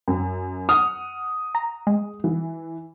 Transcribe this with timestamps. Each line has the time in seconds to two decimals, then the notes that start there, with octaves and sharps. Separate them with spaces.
0.08 F#2
0.69 F#5 D#6 F6
1.55 A#5
1.87 G#3
2.24 E3